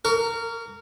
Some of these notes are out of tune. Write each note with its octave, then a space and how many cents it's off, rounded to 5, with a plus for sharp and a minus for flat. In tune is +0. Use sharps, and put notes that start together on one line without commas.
A#4 -15 C#6 +35